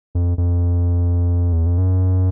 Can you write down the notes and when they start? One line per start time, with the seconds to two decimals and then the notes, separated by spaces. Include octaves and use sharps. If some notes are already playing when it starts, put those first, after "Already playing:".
0.15 F2
0.38 F2
1.53 E2
1.66 F2
1.78 F#2